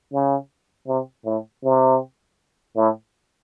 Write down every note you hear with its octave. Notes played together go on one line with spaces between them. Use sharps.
C#3
C3
A2
C3
A2